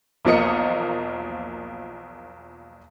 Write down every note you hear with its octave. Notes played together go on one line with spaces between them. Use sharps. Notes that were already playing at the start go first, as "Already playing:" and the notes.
B1 E2 F3 A#3 D#5 C#7